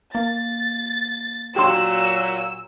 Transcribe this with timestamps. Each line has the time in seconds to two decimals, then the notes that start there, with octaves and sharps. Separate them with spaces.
0.15 A#3 A6
1.56 A#2 F#3 G4 C6 E6